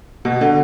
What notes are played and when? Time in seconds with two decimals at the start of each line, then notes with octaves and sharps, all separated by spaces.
0.25 B2
0.41 D3